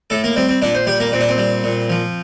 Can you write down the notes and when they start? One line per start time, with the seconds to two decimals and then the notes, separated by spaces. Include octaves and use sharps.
0.10 A2 A4
0.24 A#3
0.36 G3 C4
0.49 C4
0.62 A#2 D4
0.75 C5
0.87 G3 G4
1.00 A#3
1.12 A#2 C4
1.21 D4
1.29 C4
1.38 G3
1.64 A#2
1.90 F3